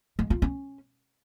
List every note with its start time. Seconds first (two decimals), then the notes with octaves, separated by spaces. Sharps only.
0.19 G#3
0.30 F4
0.42 C#4